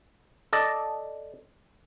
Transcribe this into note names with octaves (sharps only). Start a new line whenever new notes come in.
A4 D5 D#5